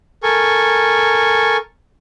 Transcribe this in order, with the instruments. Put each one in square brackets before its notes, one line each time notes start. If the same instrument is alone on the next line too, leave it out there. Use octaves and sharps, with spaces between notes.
[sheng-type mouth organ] A4 A#4 G#5 C#6